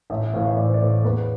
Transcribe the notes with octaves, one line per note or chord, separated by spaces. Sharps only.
A1 E5
E5
A2 E3 F5
E5
A1 D5
C5
D5
A2 E3
E2 B4